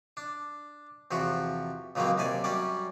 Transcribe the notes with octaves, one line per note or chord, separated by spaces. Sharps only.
D4
E2 C3 F3 F#4
C#2 C#3 F3 F#3 A#3 C4
D#2 C3 D5 G#5
F#2 G3 C#4 D5